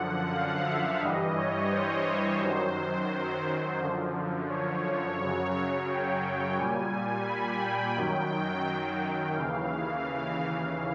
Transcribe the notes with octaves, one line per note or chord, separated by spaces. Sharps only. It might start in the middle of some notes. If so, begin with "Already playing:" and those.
Already playing: F#2 D3 F3 F#5
F5
E5
G2 E3 G3 D#5
C#5
C5
F#2 D#3 F#3 C5
F#2 D3 F3
C#5
F#2 C#3 F#3
G5
A#2 G3 G#5
B5
G5
F#2 D#3 F#3
D#2 C#3 E3 F5